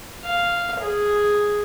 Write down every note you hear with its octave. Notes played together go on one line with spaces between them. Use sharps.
F5
G#4